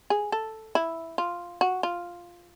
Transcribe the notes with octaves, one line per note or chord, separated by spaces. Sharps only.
G#4
A4
E4
F4
F#4
F4